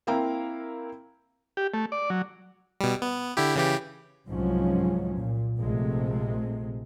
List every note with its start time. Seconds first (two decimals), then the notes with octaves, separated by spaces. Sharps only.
0.07 A#3 C4 E4 F5 G5 A#5
1.57 G4
1.74 A3
1.92 D5
2.10 F#3
2.81 B2 G3
3.02 B3
3.37 D3 E4 G4
3.56 C#3 E3 G4
4.28 C2 G#2 F3 F#3 C#4
5.19 A#2
5.59 A#1 C3 G#3 A3